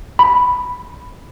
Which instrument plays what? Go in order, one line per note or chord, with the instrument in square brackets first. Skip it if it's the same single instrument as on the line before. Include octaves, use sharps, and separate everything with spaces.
[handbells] B5